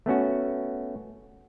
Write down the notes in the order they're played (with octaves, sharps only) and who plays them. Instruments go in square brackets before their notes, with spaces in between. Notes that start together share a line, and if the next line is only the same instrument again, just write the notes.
[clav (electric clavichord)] A3 B3 C#4 F#4